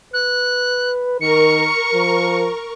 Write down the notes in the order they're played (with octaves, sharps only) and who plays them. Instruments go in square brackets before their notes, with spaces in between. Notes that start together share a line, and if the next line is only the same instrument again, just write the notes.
[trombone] B4 [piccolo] F#6
[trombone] D#3 [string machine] A#4 C#6 [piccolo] C#7
[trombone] F3